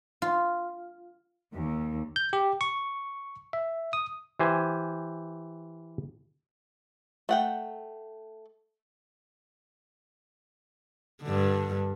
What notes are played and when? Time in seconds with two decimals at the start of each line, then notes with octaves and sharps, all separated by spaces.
0.22 F4
1.53 D#2
2.16 G6
2.33 G4
2.61 C#6
3.53 E5
3.93 D#6
4.39 E3 G4 C5 G#5
7.29 A3 F#5 G5
11.23 G2 D3